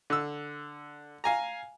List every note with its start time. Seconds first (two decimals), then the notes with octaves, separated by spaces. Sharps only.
0.10 D3 E6
1.24 F5 G#5 A#5